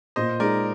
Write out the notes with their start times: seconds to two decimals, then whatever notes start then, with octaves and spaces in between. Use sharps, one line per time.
0.16 A#2 C5 D#5
0.39 G#3 D#4 G#4 A#4 D5